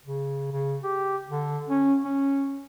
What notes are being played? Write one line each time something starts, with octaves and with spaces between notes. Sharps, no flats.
C#3
C#3
G4
D3
C#4
C#4